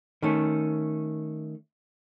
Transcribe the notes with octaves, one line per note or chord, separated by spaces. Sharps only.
D#3 A3 C#4